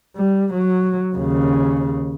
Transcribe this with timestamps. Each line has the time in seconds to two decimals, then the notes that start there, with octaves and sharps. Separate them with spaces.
0.16 G3
0.54 F#3
1.15 D#2 C#3